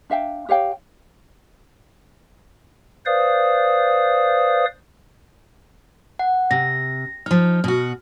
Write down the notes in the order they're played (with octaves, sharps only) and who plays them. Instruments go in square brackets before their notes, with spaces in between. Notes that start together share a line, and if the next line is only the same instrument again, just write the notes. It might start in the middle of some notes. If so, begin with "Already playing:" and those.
[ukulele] D4 E5 F5 G5
G4 C#5 F5 G5
[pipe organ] B4 C5 D5 F5 D#6
[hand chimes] F#5
[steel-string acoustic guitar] C3 [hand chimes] A#6
[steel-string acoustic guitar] F3 D#4 [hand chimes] F6
[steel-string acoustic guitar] B2 F#4